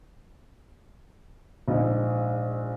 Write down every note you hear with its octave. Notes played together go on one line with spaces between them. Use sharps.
A#1 G#2 D#5